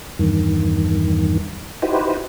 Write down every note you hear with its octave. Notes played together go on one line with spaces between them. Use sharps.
E2 G2 D#3
D#4 E4 F#4 G4 B4 C5